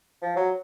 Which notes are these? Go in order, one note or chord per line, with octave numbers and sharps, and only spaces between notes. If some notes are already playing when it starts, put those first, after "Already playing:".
F3
F#3